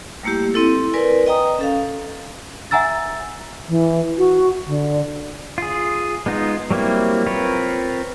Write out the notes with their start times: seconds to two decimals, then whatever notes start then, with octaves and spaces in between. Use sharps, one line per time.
0.23 G3 A3 A#3 E4 G4
0.54 C4 E4 A4
0.94 A#4 B4 D5 G#5
1.27 D#5 G5 A#5 D#6
1.59 C#4 A4 F5
2.71 E5 F#5 G#5 A#5 E6 A6
3.68 E3
4.18 F#4
4.67 D3
5.58 F4 G#4
6.26 G#3 B3 D#4 F4
6.71 F#3 G3 A#3 C4 E4
7.26 C4 F4 A#4 B4 C#5